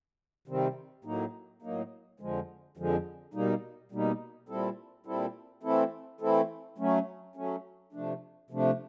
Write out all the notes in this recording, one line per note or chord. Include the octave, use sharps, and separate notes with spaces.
C3 D#3 G3 C4
A2 F#3 A#3 D#4
A2 F#3 A#3 D#4
F2 D3 F3 G#3
F2 D3 F3 G#3
B2 G3 A#3 D#4
B2 G3 A#3 D#4
A#2 G3 C4 E4 A4
A#2 G3 C4 E4 A4
E3 A3 C4 E4 A4
E3 A3 C4 E4 A4
F#3 A3 C#4
F#3 A3 C#4
C3 F3 A3 D4
C3 F3 A3 D4